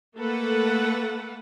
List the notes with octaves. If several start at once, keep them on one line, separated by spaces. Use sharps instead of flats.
A3 A#3 A4 B4 F#5